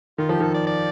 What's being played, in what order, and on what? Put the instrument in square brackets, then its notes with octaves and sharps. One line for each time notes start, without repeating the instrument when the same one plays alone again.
[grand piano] D#3 [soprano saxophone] F4
[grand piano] F3 [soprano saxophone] G4
[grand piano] D#3 [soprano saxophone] A4
[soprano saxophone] D5
D5